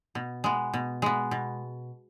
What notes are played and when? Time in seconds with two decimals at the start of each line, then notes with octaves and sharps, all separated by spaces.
0.15 B2
0.44 G#3 B3
0.74 B2
1.02 G#3 B3
1.31 B2